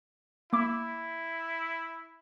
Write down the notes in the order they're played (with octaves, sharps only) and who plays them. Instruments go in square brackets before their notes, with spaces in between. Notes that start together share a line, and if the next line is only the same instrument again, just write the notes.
[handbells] A#3 D6 [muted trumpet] E4